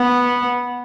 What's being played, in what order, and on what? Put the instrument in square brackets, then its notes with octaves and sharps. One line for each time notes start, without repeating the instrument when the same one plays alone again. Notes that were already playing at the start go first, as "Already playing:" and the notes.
Already playing: [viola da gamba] B3